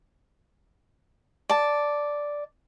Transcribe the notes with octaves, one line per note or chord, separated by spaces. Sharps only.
D5 A5